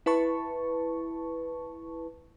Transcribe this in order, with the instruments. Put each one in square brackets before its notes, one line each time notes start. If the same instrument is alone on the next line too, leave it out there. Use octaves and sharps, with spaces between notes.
[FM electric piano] E4 B4 A5 C#6